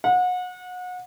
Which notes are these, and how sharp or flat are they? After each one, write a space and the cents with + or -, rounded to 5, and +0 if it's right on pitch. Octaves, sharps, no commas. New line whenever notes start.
F#5 -30